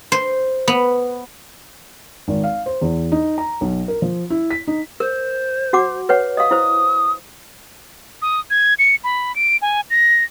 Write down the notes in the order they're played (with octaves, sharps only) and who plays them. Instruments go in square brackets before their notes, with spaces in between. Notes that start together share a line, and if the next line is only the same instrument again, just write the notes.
[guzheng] C5
B3
[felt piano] G#1
F5
C5
E2
D#4
A#5
B1
A#4
F3
E4
B6
D#4
[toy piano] A#4 [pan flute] C5
[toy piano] F#4 F#5 D6
B4 C#5 F#5
[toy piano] D#5 F5 [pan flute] D#6
[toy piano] E4 C5
[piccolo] D#6
G#6
C#7
B5
D7
G#5
A#6